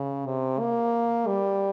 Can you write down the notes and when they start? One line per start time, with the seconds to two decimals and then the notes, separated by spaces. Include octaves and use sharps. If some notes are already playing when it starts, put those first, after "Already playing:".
Already playing: C#3
0.26 C3
0.60 A#3
1.27 G3